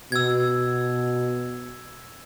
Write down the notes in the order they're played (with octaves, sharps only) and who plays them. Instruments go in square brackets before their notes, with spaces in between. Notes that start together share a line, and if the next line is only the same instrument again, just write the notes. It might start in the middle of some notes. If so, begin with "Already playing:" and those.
[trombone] B2 [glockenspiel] E6 G#6